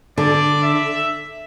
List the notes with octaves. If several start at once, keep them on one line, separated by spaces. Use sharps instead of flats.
D3 D5
E5